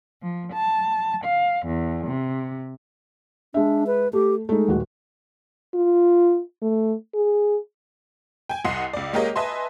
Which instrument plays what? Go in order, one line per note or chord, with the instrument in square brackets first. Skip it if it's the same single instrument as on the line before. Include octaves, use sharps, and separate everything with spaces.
[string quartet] F3
A5
F5
E2
C3
[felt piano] G#3 E5 [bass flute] D4
[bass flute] B4
[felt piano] A3 [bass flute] G4
[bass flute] G#3 [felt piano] A3 D#4
[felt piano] D#1 F#4
[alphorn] F4
A3
G#4
[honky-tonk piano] G5 G#5
C2 D#5 F#5 C6 C7
C#2 D5
G#3 A#3 G4 A#4 C#5 D#5
B4 D#5 E5 G#5 A5 C6